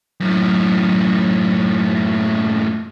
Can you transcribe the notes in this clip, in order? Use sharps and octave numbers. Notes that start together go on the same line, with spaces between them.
F#2 A2